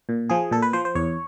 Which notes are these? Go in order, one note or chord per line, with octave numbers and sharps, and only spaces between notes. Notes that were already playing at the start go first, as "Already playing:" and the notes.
A#2
F3 G#4
A#2 A4
B4
F3 C5
C5
E2 C#5